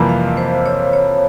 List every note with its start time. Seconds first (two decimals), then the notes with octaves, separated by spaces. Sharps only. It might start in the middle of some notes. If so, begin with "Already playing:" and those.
Already playing: F2 C3 E3 G3 A#3
0.09 F5
0.37 C5
0.66 C#5
0.93 C#5